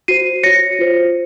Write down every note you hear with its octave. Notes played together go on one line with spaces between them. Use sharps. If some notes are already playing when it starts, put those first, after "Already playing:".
F#4 C5 C7 D#7
F#4 C#5 A#6 C#7
F4 C5